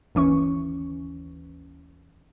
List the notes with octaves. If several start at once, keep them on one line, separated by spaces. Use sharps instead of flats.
G1 D#2 E3 C#4 C#6